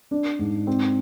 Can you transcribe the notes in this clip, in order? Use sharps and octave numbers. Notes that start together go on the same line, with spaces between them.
D4
G#2
C4